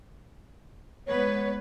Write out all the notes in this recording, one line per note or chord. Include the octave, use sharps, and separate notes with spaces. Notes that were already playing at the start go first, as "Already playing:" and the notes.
G#2 B3 B4 C#5